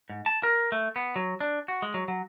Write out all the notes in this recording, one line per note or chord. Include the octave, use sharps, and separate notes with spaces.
G#2
A5
A#4
A3
B3
F#3
D4
F#4
G#3
F#3
F#3